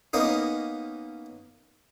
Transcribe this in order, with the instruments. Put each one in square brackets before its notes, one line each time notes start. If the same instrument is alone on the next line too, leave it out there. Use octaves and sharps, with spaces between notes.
[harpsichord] A#3 B3 C#4 D#4